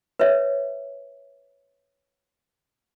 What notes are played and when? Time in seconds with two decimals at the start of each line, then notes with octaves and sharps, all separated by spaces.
0.19 B4 C#5 E5